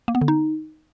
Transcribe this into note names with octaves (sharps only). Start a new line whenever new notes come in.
A#3
B3
D3
D#4